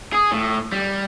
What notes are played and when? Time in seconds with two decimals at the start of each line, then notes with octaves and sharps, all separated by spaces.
0.13 G#4
0.32 A2
0.72 G3